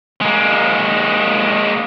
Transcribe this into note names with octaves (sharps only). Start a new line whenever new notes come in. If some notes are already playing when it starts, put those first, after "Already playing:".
G#3 A#3